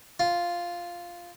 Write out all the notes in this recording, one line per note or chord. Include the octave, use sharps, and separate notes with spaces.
F4